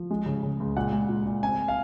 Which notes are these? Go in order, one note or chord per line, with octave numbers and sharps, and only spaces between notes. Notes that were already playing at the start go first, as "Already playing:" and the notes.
Already playing: F3
G#3
C#3
C#3
C#2
A#2 F#5
G#3
A#2
A#2
C4 G#5
F5